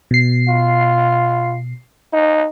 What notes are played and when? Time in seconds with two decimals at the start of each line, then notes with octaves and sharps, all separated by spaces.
0.11 B2 C7
0.48 F4
2.13 D#4